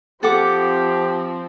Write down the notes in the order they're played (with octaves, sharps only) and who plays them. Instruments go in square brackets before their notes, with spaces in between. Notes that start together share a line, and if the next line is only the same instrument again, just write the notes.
[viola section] F3 C4 [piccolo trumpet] G4 [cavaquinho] A4 F#5 D6